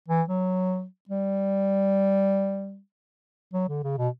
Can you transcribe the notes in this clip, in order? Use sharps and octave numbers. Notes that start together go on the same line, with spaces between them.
E3
F#3
G3
F#3
D3
C#3
B2